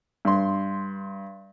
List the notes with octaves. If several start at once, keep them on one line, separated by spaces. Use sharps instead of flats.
G2 C6